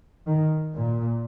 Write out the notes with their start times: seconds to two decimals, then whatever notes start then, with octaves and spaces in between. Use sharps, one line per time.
0.27 D#3
0.77 A#2